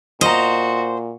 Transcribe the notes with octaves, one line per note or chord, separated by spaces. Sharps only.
A#2 F#4 C5 D#5 A#5